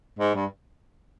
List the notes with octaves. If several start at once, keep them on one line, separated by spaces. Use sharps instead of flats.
G#2
G2